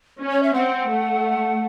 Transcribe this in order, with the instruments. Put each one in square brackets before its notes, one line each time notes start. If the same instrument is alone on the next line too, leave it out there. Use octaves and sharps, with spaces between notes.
[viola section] C#4
[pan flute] C#5
E5
[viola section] C4 [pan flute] F#5
[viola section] A3